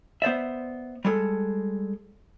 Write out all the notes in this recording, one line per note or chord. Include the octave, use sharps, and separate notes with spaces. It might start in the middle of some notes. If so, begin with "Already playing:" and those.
B3 C5 D5 E5
G3 G#3 A4